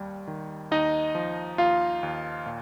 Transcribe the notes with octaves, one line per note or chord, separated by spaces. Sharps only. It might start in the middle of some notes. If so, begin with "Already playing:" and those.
Already playing: D#2 G3
D#3
D#2 D#4 D#5
F3
D#2 F4 F5
D#2
A#2